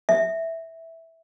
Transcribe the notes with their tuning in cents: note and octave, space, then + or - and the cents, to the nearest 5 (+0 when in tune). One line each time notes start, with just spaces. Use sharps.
E5 -5